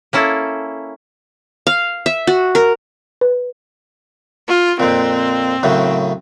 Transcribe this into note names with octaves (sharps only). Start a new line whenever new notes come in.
A#3 C#4 E4 A4
F5
E5
F#4
A#4
B4
F4
F2 A#2 C4
F#2 A2 C#3